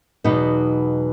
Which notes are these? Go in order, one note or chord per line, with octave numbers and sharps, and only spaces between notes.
E2 B2 F#3 B3 D#4